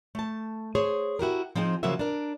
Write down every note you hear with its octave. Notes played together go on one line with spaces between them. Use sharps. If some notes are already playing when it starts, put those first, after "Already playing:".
A3 A5
G#4 C5 C#5
E4 F#4 G4 A#4
F3 C4 D#4 G#4
C#3 F3 F#3 A#3 F#4 E5
D4 A#4